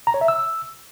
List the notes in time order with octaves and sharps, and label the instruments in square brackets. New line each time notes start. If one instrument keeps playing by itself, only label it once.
[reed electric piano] A#5
C#5
E5
E6